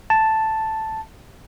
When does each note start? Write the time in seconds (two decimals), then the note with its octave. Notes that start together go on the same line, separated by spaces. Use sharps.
0.10 A5